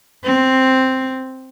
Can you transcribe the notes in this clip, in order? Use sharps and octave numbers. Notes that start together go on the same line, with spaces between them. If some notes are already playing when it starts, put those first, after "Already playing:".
C4